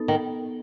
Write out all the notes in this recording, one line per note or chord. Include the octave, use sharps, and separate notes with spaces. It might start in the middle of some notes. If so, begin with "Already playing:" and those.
Already playing: B3 D#4 A4
D#3